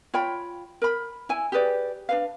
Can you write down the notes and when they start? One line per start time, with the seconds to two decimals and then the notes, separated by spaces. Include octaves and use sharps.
0.14 F4 C#5 G5 B5
0.82 A#4 B5
1.29 E4 G#5
1.52 G4 G#4 B4 D5
2.09 D4 B4 F5